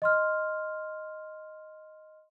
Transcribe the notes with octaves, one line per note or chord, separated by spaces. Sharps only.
D#5 C6 F6